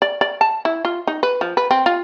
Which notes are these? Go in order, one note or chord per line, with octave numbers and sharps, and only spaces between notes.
D5
D5
A5
E4
F4
D#4
B4
F3
B4
C4
F4